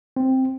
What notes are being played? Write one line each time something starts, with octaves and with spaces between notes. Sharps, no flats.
C4